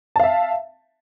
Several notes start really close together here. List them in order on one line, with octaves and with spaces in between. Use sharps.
A5 F5 E5